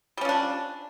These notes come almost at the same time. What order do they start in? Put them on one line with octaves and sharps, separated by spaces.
G3 C#4 F3 D4